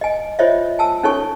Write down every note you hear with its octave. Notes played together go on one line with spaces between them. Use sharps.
D#5 G#5
F4 C5 C#5 D#5 E5
G#5 A5 E6
C#4 D#4 A4 C#5 G#5 C#6